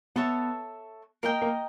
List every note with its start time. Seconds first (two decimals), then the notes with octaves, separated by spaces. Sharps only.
0.16 B3 A4 C#5 E5 A5
1.23 A#3 A#4 D#5 G5
1.42 A#3